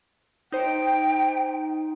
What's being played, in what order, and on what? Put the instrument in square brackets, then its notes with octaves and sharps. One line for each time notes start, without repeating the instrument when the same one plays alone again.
[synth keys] D#4 C5 [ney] G5